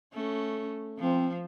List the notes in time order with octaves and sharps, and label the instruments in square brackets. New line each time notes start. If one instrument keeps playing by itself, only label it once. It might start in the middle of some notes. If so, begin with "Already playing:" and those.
[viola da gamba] A3 C#4
[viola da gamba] F3 [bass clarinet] C4